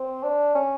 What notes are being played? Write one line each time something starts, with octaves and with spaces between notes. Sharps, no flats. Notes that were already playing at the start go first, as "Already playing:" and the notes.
Already playing: C4
D4
C#4